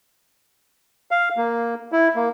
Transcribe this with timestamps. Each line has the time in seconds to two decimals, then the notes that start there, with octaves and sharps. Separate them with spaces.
1.11 F5
1.37 A#3
1.92 E4
2.16 A#3